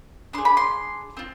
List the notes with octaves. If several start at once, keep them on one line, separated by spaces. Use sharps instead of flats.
D4 G#4 C6
B5
C6
C4 F4